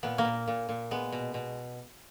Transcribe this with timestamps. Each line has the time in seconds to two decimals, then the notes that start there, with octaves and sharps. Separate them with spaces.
0.03 A#2 B3
0.18 A#3
0.25 A#2
0.48 A#2
0.69 A#2
0.91 G#3 B3
1.12 B2
1.34 B2